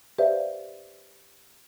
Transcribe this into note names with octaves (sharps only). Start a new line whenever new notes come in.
G4 B4 C5 D5 E5 F5